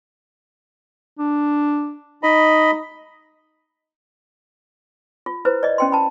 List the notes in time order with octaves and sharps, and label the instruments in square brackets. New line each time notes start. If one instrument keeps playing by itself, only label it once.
[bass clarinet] D4
[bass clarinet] D#4 [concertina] D#5 B5
[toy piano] F4
E4 B4 C5
D5 D#5
C#4 G5 C6
A5 B5